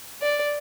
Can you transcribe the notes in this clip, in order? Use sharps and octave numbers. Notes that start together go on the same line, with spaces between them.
D5